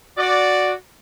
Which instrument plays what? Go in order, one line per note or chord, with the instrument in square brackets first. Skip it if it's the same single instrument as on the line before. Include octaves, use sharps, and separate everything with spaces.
[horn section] F#4 D5